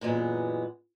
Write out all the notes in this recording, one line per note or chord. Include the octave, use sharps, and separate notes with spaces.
F#2 A#2 E3 G#3 B3